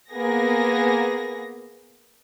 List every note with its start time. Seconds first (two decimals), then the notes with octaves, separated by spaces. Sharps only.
0.11 A#3 B3 G#4 A#6